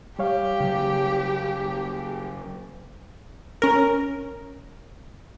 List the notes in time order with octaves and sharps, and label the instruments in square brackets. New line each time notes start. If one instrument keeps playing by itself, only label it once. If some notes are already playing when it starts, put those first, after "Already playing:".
[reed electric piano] G3 C#5 F5 [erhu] G4
[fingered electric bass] C#3 F#3
[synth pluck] C#4 A#4